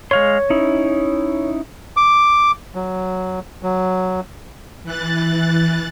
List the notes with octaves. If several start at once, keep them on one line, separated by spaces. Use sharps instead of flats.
G#3 C#5 F5 C6
C#4 D#4 E4
D6
F#3
F#3
E3 F#6 A6